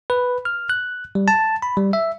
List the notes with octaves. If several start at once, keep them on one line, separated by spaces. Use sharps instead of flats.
B4
F6
F#6
G3
A5
B5
G3
E5